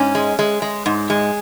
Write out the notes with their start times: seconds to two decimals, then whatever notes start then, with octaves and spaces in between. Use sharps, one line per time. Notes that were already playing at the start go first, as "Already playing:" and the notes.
Already playing: G#2 C#4
0.15 G#3
0.39 G#3
0.62 G#3
0.86 G#2
1.10 G#3